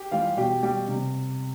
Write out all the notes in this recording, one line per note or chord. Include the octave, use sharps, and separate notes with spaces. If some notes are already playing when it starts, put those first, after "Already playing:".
Already playing: G4 G5
E3 G3 F4 F5
B2 G4 G5
G3 G4 G5
C3